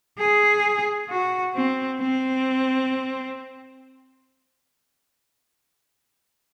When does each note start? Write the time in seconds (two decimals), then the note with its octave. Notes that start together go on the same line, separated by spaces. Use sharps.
0.19 G#4
1.10 F#4
1.55 C4
1.99 C4